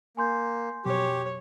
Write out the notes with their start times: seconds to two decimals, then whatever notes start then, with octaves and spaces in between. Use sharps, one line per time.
0.17 A#3 G#5 C6 G6
0.85 F2 B2 F#3 G4 C#5